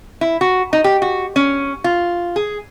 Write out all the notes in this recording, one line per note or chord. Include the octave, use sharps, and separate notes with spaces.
E4
F#4
D#4
G4
F#4
C#4
F4
G#4